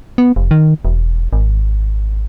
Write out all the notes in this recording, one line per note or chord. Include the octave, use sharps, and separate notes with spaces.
B3
F1
D#3
E1
G#1